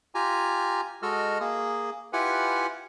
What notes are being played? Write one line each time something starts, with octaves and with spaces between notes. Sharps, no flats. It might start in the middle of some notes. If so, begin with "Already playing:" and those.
F4 G4 G#5 A#5
G#3 F#4 A4 D#5 E6 F6
A#3 G#4
E4 F4 G4 B4 F#5 G#5